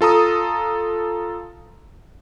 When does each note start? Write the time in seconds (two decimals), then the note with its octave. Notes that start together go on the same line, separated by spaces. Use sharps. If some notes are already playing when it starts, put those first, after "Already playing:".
0.01 F4 A4 A#5 D#6